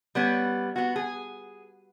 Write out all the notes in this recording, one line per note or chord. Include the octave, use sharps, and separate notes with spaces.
G3 B3 C#4
B3 F#4
G#4